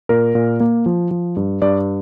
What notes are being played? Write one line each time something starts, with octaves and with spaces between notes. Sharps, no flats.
A#2 A#4
A#2
A#3
F3
F3
G2
G2 D5